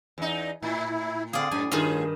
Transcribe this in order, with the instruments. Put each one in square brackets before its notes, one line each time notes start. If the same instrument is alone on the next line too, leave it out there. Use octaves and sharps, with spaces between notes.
[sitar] E2 D#4
[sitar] A2 [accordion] E4
[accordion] D3 C4 F5 [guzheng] G#4 D5
[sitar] F#2 [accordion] A2 [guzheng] G#5
[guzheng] G2 D#3 [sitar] F4 G#4